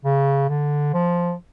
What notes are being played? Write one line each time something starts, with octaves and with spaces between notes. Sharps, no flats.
C#3
D3
F3